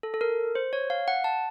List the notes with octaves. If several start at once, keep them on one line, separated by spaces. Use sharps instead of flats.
A4
A4
A#4
C5
C#5
F5
F#5
A5